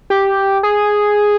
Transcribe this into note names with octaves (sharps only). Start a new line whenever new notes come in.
G4
G#4